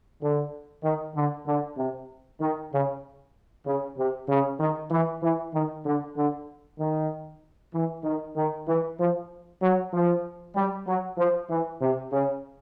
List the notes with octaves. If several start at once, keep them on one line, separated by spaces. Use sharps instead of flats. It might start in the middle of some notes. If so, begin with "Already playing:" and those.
D3
D#3
D3
D3
C3
D#3
C#3
C#3
C3
C#3
D#3
E3
E3
D#3
D3
D3
D#3
E3
D#3
D#3
E3
F3
F#3
F3
G3
F#3
F3
E3
C3
C#3